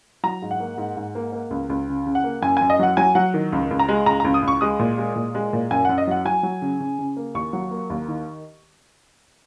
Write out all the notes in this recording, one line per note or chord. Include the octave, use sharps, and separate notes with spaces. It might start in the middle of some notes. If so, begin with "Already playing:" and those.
F#3 A#5
G#2
F#5
A#3
G#2
G#2
A#3
A#3
C#2
C#2
C#3
C#3
F#5
A#3
F#2 G#5
F#2 G#5
D#5
F#3 F#5
F#3 G#5
F#3 F#5
D#3
C#2
C#2
A#5
G#3
C#2 A#5
A#5
C#2
D#6
C#2
C#6
G#3 D#6
A#2
G#3
A#2
G#3
A#2
F#2 G#5
F#2 F#5
D#5
F#3 F#5
F#3 G#5
F#3
C#3
C#3
C#3
A#3
D#2 C#6
F#3
A#3
D#2
D#3